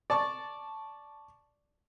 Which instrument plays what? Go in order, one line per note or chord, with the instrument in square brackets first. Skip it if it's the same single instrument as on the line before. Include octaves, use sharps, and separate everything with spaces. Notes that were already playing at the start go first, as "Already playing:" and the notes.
[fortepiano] D5 A5 C#6